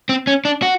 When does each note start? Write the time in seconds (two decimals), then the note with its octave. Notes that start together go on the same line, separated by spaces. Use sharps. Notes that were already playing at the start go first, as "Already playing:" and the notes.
0.09 C4
0.27 C#4
0.45 D4
0.62 F#4